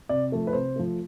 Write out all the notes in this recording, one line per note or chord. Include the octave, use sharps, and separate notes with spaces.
C3 D5
F3 A3
B4
C3 C5
F3 A3